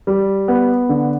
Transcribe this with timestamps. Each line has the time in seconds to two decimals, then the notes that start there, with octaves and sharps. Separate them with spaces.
0.07 G3
0.48 B3
0.89 D3